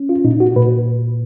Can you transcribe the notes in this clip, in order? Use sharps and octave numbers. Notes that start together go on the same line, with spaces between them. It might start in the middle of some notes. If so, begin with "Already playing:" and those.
Already playing: C#4
F4
A#2 D#4
F#4
A#2 B4